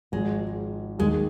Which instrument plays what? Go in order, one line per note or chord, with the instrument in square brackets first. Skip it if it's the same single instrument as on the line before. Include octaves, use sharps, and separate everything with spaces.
[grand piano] G#1 G#2 F3 [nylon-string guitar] G#3
[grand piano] D#2 D#3 A#3 D#4 [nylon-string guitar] G#3